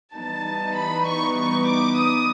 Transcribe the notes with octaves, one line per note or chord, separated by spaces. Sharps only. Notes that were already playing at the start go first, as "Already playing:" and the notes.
E3 G3 B3 D#4 A5
B5
C#6
C#6
D6
D#6